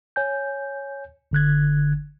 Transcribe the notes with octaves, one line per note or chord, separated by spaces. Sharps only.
C#5 G#5 G6
G1 D3 F#6 G#6